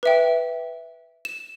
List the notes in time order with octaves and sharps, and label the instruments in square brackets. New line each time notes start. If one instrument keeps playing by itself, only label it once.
[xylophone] B4 E5 G5
E7